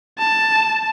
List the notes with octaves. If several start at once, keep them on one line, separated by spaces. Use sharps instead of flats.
A5